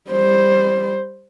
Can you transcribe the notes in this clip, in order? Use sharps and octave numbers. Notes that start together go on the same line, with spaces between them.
G3 C5